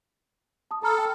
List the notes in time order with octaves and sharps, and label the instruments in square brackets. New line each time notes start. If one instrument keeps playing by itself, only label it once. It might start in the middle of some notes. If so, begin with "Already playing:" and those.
[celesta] A5 D#6
[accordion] A4 [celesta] A#5 B5 F6
[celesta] G5